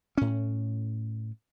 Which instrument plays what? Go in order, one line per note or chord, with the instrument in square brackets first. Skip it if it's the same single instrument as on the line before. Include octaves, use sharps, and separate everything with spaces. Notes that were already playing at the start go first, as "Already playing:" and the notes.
[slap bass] A2 C#4